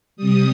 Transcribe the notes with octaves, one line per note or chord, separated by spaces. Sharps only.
C3 G3 D#6